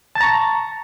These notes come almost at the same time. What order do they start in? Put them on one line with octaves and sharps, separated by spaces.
A5 A6 A#5 C#6